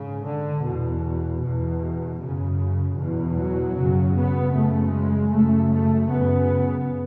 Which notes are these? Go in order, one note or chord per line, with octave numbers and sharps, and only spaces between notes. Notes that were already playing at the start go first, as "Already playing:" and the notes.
Already playing: G#2 C#3
D3
E2 B2
E2 B2
F#2 C#3
E2 B2
F#3
F#2 C#3
B3
F#2 C#3 A3
G#3
F#2 C#3 A3
A3
F#2 C#3 B3